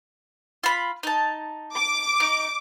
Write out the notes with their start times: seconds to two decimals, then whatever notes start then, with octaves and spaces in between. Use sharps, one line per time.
0.64 F4 B5
1.03 D#4 A5
1.77 D6
2.20 D#4